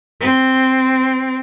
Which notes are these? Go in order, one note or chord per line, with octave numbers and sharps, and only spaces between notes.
C4